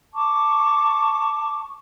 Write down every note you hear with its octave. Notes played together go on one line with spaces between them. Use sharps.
A5 C#6 D6